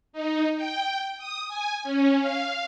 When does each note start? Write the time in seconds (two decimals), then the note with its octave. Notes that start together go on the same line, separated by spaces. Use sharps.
0.13 D#4
0.57 G5
1.18 D#6
1.48 G#5
1.84 C#4
2.20 F5